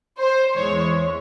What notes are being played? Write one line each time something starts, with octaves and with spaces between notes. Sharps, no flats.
C5
E2 E3 G#3 C#5